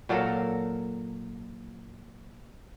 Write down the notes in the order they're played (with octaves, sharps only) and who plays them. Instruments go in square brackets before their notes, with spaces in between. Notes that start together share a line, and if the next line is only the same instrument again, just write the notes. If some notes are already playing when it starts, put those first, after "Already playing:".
[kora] A#2 F#3 A4 A#4